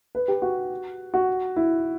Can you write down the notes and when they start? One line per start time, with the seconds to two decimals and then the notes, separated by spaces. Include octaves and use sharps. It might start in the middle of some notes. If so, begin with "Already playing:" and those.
0.15 B4
0.28 G4
0.42 F#4
1.14 F#4
1.56 E4